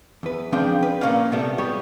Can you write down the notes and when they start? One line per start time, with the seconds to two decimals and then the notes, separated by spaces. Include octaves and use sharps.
0.23 E2 B4
0.52 C#3 F3 C4 D4 G5
0.83 B4
1.01 A#2 E3 A#3 C#4 D5 F5
1.32 A2 C3 G3 B3 A4 E5
1.58 G3 B3 G4 G#4 C#5